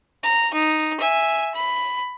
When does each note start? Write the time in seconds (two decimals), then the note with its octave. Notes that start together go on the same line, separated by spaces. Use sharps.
0.23 A#5
0.54 D#4
1.00 E5 G#5
1.55 B5